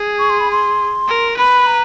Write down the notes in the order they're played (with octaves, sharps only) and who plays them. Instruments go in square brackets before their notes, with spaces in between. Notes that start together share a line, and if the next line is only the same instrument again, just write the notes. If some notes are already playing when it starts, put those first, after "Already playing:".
Already playing: [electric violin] G#4
[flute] C#6
C6
B5
C6
[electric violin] A#4
[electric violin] B4 [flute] B5
[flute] A#5